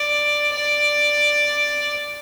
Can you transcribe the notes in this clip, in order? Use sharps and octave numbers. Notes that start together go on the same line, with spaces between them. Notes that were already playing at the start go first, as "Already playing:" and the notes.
Already playing: D5
D5